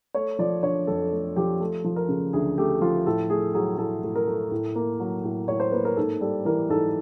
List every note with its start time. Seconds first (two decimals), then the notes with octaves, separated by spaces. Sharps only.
0.14 A3 C#5
0.39 F3 D5
0.63 D3 C#5
0.87 F2 A4
1.13 A3
1.36 F3 G4
1.60 A3
1.84 F3
1.96 A#4
2.08 C#3
2.33 D2 G#4
2.58 A3 G4
2.81 F3 F4
3.06 A2 A4
3.30 A3 G#4
3.54 F#3 G#4
3.78 A2 A4
4.03 A2
4.15 A#4
4.27 A3
4.51 A2
4.76 A#3
5.00 F#3
5.24 A2
5.48 A2 C#5
5.60 C5
5.72 A#3 B4
5.85 A#4
5.97 G#2 A4
6.21 G3 A4
6.45 E3 A#4
6.69 G#2 A4